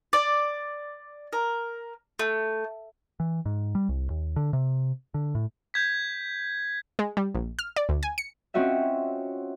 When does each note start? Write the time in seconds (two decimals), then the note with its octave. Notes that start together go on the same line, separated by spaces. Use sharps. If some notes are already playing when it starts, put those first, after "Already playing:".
0.13 D5
1.33 A#4
2.19 A3
3.20 E3
3.46 G#2
3.75 G3
3.89 C2
4.10 D#2
4.36 D3
4.53 C3
5.14 D3
5.35 A2
5.74 G6 G#6 B6
6.99 G#3
7.17 G3
7.35 A#1
7.59 F6
7.76 D5
7.89 D2
8.03 G#5
8.18 C#7
8.54 C4 C#4 F4 F#4 D#5 E5